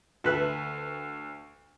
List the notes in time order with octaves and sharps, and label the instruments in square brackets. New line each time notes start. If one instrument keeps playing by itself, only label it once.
[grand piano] D2 [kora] A4 B4 E5